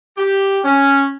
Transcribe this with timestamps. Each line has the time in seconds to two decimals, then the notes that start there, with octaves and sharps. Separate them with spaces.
0.17 G4
0.65 C#4